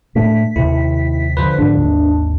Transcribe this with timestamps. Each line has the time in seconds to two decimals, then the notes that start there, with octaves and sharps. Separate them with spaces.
0.15 A2 A3 D4 B6
0.56 D#2 C3 D#3 E4
1.37 D3 D#3 F3 B4 C5
1.58 G#1 D4
1.77 D#2